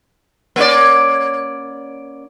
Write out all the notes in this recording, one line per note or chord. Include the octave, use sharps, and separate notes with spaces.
A#3 C#4 D5